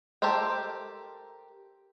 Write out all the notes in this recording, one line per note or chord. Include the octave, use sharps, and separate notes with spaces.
G4 A4 A#4 C5 G5